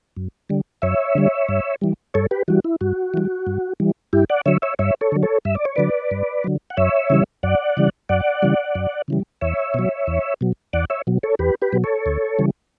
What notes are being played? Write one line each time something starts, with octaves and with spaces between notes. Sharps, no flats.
F#2
D3 G3
F#2 C#5 E5
D3 G3
G2
E3 G3
G2 A4 C#5
G4 B4
E3 G3 F#4
E4
G2 F#4
E3 G3
G2
E3 G3
G2 E4 G4
D5 F#5
D3 F#3 C#5 E5
C#5 E5
G2 C#5 E5
A4 C#5
D3 F#3
A4 C#5
G2 E5
D5
C#5
D3 F#3 B4 D5
G2
D3 F#3
F#5
F#2 C#5 E5
C#3 E3 G3
F#2 D5 F#5
C#3 E3 G3
F#2 D5 F#5
C#3 E3 G3
F#2
C#3 E3 G3
E2 C#5 E5
B2 F#3
E2
B2 F#3
E2 D5 F#5
C#5 E5
B2 F#3
A4 C#5
E2 G4 B4
G4 B4
B2 F#3
A4 C#5
D2
C#3 E3 G3